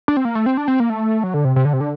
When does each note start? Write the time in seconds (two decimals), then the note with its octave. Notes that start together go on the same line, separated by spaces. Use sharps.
0.08 D4
0.17 C4
0.25 A#3
0.35 A3
0.46 C4
0.57 D4
0.68 C4
0.80 A#3
0.90 A3
1.23 F#3
1.34 D3
1.45 C3
1.56 C3
1.65 D3
1.73 C3
1.80 D3